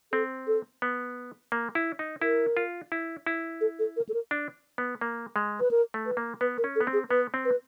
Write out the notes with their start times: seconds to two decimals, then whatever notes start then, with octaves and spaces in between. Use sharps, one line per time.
0.12 C4 A4
0.47 A4
0.82 B3
1.52 A#3
1.75 E4
1.99 D#4
2.21 E4 A#4
2.57 F4
2.92 E4
3.26 E4
3.61 A4
3.79 A4
3.97 A#4
4.09 A4
4.14 A#4
4.31 D4
4.78 B3
5.01 A#3
5.36 G#3
5.60 B4
5.71 A#4
5.94 A3
6.06 B4
6.17 A#3
6.41 B3 B4
6.58 A#4
6.64 C#4
6.76 A4
6.81 B3
6.87 C4
6.93 G#4
7.10 B3 B4
7.34 C4
7.45 B4